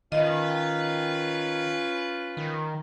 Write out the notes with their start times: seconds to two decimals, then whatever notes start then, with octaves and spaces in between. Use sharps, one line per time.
0.12 D#3 C#4 F4 B4 D#5
2.37 D#3